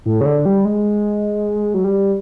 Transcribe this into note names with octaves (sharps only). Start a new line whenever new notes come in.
A2
C#3
D3
G3
G#3
F#3
G3